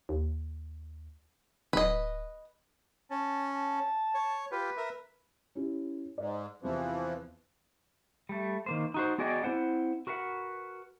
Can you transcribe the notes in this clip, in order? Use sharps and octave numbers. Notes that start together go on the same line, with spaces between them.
D#2
D1 B4 D#5
C#4 A5
A5
C#5
F4 G4 B4
A#4 E5
C#4 E4 G4
G#2 D5
E2 C3 E3 F3
G3 A3
D#3 A#3 C5
D#4 F#4 C5
B3 F#4 G#4 D5 D#5 G5
C4 E4 C5 F#5
F#4 A#4 B4 F5 F#5